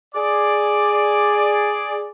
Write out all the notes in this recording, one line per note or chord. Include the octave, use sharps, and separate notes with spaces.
G#4 D5